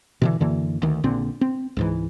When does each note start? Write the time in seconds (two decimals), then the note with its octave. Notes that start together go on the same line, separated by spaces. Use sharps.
0.22 B2 D3 E3
0.40 F#2 D3 E3 A#3
0.82 D2 D#3
1.04 A#1 A#2 D3 C4
1.41 C4
1.77 C#2 G#2 E3